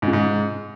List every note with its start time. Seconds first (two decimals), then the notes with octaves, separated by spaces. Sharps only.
0.02 G#2
0.08 C#3
0.13 G#2